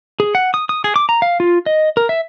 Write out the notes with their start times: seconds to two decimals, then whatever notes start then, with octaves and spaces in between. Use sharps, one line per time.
0.20 G#4
0.35 F#5
0.54 D#6
0.69 D#6
0.84 G#4
0.96 D6
1.09 A#5
1.22 F5
1.40 F4
1.66 D#5
1.97 A#4
2.09 E5